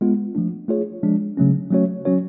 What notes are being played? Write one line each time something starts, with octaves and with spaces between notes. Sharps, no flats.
G#3 B3 F4
F3 A3 D4
A3 F4 G#4 C#5
F3 G#3 D4
C#3 F#3 A3 C#4
F#3 A3 C#4 F#4 C#5
F#3 C#4 F#4 C#5